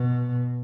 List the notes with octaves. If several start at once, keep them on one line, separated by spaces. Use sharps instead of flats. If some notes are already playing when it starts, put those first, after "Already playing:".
Already playing: B2